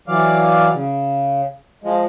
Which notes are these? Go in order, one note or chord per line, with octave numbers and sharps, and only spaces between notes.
E3 F#3 D5 F5
C#3
F3 G#3